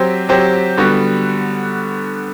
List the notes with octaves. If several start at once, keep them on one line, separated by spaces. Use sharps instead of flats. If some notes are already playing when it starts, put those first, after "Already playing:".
Already playing: F#3 C4 G4 C5
F#3 C4 G4 C5
D3 G3 B3 F#4